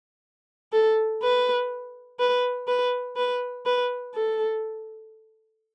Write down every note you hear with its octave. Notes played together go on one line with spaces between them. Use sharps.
A4
B4
B4
B4
B4
B4
A4